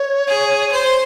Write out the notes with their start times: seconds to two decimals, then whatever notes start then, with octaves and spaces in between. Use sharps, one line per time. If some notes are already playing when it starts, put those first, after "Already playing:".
Already playing: C#5
0.28 G#4
0.72 C5